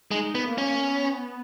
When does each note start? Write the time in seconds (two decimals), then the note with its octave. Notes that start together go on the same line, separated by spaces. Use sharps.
0.11 G#3 D#4
0.35 B3
0.47 A#3
0.58 C#4
0.81 B3